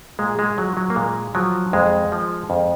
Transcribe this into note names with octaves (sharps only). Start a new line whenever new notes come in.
A#2 G#3
G#3
F3 F#3
F#3
A#3
A#2 G#3
F3 F#3
F2 G#3
F3
F2